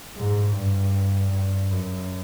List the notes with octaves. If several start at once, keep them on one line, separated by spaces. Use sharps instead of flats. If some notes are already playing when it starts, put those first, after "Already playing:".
G#2
G2
G2
F#2